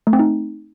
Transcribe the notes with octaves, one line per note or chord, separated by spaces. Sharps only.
A3
C4
D#4